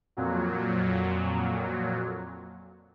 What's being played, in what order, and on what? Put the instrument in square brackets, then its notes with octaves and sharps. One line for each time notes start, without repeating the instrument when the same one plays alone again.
[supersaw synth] F2 A#2 F#3